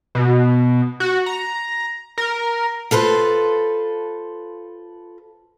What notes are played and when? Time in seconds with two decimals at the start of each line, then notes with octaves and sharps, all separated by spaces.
0.15 B2
1.00 F#4
1.26 A#5
2.18 A#4
2.91 F4 A4 B4 C5